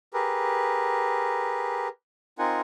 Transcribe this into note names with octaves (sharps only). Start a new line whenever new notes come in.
G4 G#4 A#4 B4
C4 D#4 F4 A#4 F#5 G#5